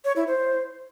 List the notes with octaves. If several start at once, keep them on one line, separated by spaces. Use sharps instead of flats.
C#5
E4
C5